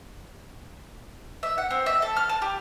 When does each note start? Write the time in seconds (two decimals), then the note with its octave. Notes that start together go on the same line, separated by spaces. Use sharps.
1.43 E5
1.58 F#5
1.71 C4
1.86 E5
2.02 A4
2.16 F6
2.29 A5
2.42 G4